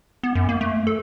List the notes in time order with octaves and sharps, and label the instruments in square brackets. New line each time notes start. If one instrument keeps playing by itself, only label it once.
[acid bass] B3
F#2
A#3
A3
A4